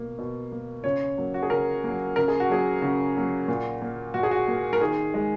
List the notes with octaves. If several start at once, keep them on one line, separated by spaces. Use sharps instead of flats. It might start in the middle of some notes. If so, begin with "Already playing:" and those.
Already playing: B2 A#3
B2
A#3
C#3 C#5
F#3 A#3
F#4
G#4
C#3 A#4
F#3 A#3
C#3 A#4
G#4
F#4
F#3 A#3 G#4
C#3 F#4
F#3 A#3
A#2
A#3
A#2 F#4
G#4
F#4
A#3
A#4
D#3 G#4
G#3